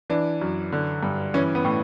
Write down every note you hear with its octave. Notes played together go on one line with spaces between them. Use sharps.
E3 D4
F#2
D3
G2
E3 C#4
B3
A2